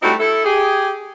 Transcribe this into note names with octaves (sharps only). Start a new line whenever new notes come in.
G3 A3 C4 D#4 E4 F#4
E4 A4
G4 G#4